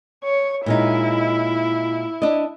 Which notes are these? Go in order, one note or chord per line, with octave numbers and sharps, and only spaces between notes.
C#5
A#2 G#3 D#4 E4
D4 D#5